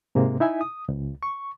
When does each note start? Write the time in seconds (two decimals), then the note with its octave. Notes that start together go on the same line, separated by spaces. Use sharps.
0.15 G#2 C3 G#3 A#3
0.40 D#4 E4 E5 G#5
0.61 D#6
0.89 C#2
1.23 C#6